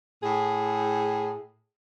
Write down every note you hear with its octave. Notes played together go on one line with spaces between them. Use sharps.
A2 G#4